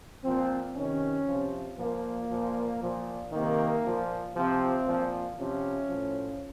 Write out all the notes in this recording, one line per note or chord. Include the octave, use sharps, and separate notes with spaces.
A#2 F3 C4
C3 D#3 C#4
C3 F3
A#2 F3 A#3
A#2 F3
A#2 F3
C3 D#3 A#3
A#2 F3
C3 F3 C4
A#2 F3
C3 F3 C#4
A2 F3